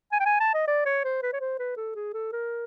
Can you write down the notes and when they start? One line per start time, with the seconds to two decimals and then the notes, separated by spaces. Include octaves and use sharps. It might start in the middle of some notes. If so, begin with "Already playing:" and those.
0.12 G#5
0.20 G5
0.26 G#5
0.40 A5
0.54 D#5
0.68 D5
0.86 C#5
1.04 C5
1.22 B4
1.33 C#5
1.41 C5
1.59 B4
1.77 A4
1.95 G#4
2.14 A4
2.32 A#4